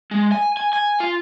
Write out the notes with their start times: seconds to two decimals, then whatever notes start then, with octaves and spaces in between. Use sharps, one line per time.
0.11 G#3
0.32 G#5
0.57 G#5
0.73 G#5
1.00 F4